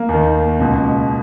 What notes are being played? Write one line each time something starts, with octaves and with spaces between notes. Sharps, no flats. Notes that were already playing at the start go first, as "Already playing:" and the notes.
Already playing: A#3
D#2 D#3
C#2 B2